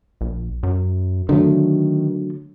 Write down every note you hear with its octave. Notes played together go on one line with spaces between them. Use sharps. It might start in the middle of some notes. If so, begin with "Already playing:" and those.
A#1
F#2
D3 D#3 F#3 A3